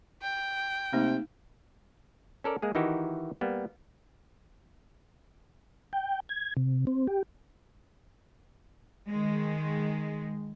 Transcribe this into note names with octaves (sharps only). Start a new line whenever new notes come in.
G5
C3 A3 A#3 D#4
C#4 A4 A#4 D5
G#3 A#3 G#4
D#3 E3 D#4 E4 F#4 G4
G3 A#3 B3
G5
G#6
C3
C4
G4
D#3 G#3